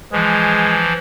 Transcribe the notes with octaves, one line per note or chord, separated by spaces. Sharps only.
E3 F3 G#3